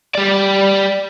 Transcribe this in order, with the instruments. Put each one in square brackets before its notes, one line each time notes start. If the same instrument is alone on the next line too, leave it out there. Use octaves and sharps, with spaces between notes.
[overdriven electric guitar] G3 D5